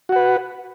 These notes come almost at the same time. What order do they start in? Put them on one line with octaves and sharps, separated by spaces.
F#4 F#5 B4